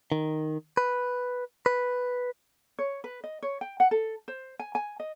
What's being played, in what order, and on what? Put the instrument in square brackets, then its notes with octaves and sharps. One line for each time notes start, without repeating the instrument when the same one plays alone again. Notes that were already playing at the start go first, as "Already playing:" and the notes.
[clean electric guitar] D#3
B4
B4
[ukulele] C#5
B4
D#5
C#5
G5
F#5
A4
C5
G#5
G#5
D#5